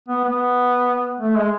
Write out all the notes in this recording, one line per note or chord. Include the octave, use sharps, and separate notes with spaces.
B3
B3
A3
G#3